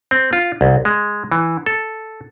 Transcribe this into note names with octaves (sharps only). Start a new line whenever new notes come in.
C4
F4
C2
G#3
E3
A4